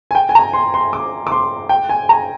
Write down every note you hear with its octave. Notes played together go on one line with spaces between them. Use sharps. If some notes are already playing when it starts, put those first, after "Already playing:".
G#5
G5
G#5
A#5
C6
C6
D6
D6
C6
G5
G#5
A#5